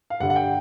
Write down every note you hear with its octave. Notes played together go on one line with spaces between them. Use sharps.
F5
G2 D3 G3 F#5
F#5
G5